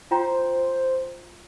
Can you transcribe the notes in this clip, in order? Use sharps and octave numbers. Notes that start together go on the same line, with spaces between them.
F4 C5 G5 A#5